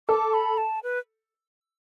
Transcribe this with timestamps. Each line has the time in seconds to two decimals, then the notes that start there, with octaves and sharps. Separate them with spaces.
0.09 A4 D6
0.34 B5
0.57 A5
0.83 B4